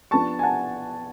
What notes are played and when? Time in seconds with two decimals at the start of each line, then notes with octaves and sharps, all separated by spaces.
0.11 F3 B3 D4 A5 C#6
0.39 G#5
0.43 F#5 A5